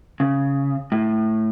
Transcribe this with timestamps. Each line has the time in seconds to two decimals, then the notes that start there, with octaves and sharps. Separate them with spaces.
0.20 C#3
0.92 A2